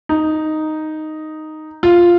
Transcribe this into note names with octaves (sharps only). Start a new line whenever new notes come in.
D#4
F4